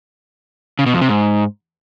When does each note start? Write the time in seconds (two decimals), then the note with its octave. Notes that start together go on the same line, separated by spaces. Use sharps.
0.79 C#3
0.86 B2
0.94 F2
1.01 C3
1.09 G#2